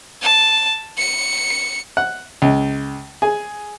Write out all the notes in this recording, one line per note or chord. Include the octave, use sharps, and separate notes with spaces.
A5
C#7
F#5
C#2
G#4